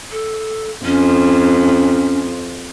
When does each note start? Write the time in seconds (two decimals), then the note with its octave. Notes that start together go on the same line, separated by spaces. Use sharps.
0.11 A4
0.85 F2 C#4